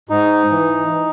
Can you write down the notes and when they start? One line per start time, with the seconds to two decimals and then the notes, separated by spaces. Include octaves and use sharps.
0.09 G#2 D#4
0.51 E3